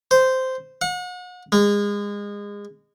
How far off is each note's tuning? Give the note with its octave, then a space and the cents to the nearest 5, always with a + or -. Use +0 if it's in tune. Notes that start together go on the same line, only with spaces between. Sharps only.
C5 -10
F#5 -40
G#3 -30